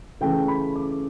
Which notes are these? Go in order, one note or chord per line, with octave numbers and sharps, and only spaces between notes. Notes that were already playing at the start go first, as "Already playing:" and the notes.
C#3 E3 A3 C#4 G5
B5
D6